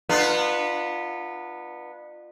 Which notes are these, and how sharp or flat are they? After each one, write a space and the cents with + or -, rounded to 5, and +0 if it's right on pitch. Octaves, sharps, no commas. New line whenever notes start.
B3 -15 D4 +45 F4 +0